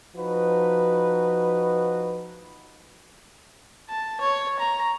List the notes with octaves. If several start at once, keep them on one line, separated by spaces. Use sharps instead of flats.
F3 D#4 F#4 B4
A5
C#5
A#5